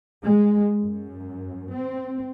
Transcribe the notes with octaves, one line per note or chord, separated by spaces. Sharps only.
G#3
F#2
C4